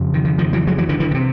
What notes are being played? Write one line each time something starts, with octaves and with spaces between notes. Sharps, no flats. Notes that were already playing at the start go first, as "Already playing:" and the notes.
Already playing: F2 C#3
D#3
D#3
D#3 F3
E3 F#3
F#3 G#3
E3 F#3
D3 E3
D3 E3
D3
C3